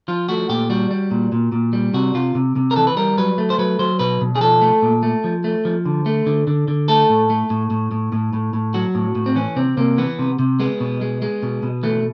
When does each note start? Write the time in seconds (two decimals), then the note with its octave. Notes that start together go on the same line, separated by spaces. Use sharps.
0.08 F3 F4
0.29 A3 F#4
0.49 A#2 G4
0.70 G3 F#4
0.91 G3
1.11 A#2
1.32 A#2
1.52 A#2
1.73 G3
1.94 C3 F#4
2.14 C3 F4
2.35 C3
2.56 C3
2.71 A#4
2.76 E3 A4
2.87 B4
2.97 G3 A#4
3.18 F#3 B4
3.38 A3
3.50 C5
3.58 F#3 B4
3.79 F#3 C5
3.99 B2 B4
4.21 B2
4.36 G#4
4.41 F3 A4
4.62 A3
4.82 A#2
5.03 A3
5.24 F3
5.44 A3
5.65 F3
5.86 D3
6.06 A3
6.26 D3
6.47 D3
6.68 D3
6.88 A3 A4
7.09 A2
7.30 A3
7.50 A2
7.71 A2
7.91 A2
8.13 A2
8.33 A2
8.54 A2
8.74 F#3 F#4
8.95 A2
9.15 A2
9.26 C4
9.36 E3 C#4
9.56 C3 C4
9.77 C3 A#3
9.98 E3 B3
10.19 C3
10.39 C3
10.60 G#3 B3
10.80 B2
11.01 G#3
11.22 G#3
11.43 B2
11.63 B2
11.83 E3 A3